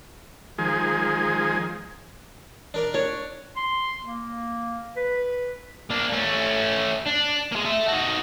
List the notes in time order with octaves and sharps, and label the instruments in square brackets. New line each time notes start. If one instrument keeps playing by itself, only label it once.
[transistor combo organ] D#3 F3 G#3 G#4
[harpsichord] D4 A#4 D5
[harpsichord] D4 [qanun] C#5
[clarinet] C6
A#3
B4
[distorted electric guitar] A#3 D4
A3 C#4
D4
G#3 A#3
A4 E5
D#4 F#4